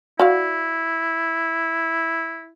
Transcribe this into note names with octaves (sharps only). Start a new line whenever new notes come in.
E4 F#4 D5 F5